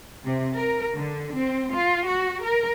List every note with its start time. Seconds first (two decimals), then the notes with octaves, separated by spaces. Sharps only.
0.24 C3
0.54 A#4
0.95 D3
1.37 C4
1.71 F4
2.07 F#4
2.43 A#4